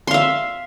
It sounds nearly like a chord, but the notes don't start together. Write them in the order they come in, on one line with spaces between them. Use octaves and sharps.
C6 F5 E5